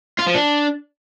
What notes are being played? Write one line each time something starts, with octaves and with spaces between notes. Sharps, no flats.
F4
F3
D4